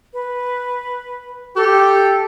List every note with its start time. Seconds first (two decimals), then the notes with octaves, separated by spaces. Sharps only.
0.14 B4
1.56 G4 A4